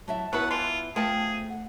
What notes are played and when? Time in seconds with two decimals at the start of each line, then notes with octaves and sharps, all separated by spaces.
0.08 F#3 E4 E5 A5
0.33 F#3 B3 E4 F#4 B4 F#5
0.51 E3 F4 C6
0.96 F3 A3 G#4 G5 A5
1.50 F#5